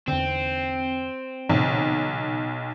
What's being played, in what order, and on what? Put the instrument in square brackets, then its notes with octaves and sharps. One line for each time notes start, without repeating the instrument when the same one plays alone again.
[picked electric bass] E2 D3 [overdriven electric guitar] C4
[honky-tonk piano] B1 [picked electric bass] A#2 C#3 E3